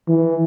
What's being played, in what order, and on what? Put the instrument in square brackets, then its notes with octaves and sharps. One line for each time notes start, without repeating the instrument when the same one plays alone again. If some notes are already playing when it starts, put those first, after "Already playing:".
[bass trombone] E3